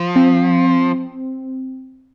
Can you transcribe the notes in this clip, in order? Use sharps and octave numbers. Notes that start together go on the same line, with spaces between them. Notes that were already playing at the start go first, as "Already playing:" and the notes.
Already playing: F3
C4